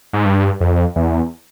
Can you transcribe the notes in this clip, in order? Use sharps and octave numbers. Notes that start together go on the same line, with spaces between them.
G#2
G2
F2
E2